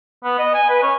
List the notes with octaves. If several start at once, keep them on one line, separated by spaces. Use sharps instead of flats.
B3
D#5
G#5
B4
C#4